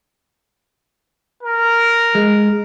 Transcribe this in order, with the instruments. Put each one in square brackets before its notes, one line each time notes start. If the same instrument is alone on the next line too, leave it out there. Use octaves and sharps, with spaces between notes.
[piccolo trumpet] A#4
[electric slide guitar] G#3